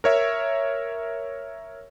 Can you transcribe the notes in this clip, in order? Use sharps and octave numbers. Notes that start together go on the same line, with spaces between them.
A#4 C#5 E5